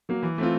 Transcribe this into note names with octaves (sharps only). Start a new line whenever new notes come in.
F#3 A#3
E3
A3 C4 F4